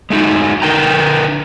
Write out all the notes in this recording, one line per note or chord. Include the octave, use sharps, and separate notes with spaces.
G#3 A3 D#4 F#4
D3 A#4 B4 G5 A#5